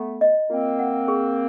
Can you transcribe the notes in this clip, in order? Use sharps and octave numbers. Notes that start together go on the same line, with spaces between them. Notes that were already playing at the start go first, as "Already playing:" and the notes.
Already playing: A3 B3 B5
D#5
A#3 C4 F4
F#5
G#4